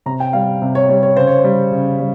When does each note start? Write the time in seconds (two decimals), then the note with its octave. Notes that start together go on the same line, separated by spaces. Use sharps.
0.06 C3 A#5
0.20 G5
0.33 G3 F5
0.62 C3
0.75 C#5
0.89 G3 C#5
1.03 C#5
1.17 C#3 C5
1.27 C#5
1.38 C5
1.44 G3
1.72 C#3
2.00 G3